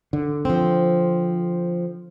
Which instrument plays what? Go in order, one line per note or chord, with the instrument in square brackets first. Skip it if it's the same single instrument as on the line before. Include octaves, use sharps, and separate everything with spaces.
[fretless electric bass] D3
[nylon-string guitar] F3 C4